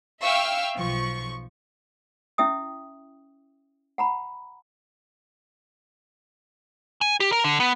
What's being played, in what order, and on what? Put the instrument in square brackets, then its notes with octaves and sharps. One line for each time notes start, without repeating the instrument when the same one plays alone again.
[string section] E5 F5 G5 C#6 E6 F6
B1 F3 C#6
[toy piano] C#4 E4 E5 G5 D#6
F#5 A#5 B5
[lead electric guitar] G#5
G4
A#4
D3
B3